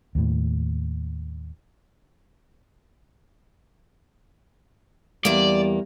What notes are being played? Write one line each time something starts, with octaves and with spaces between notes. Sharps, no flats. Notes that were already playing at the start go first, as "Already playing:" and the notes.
D#2 A2
E2 G3 A#3 D5